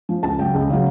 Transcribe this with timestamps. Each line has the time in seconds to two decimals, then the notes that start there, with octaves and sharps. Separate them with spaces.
0.09 F3
0.23 C#2 A5
0.38 C#3 F#3 G5
0.54 C#2
0.70 C#3 F#3